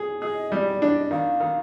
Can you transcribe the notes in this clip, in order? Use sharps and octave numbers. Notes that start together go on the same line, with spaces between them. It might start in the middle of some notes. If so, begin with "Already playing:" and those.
Already playing: G#4
G#4 D#5
G3 D5 D#5
D4 D#5
D#3 F5
D#3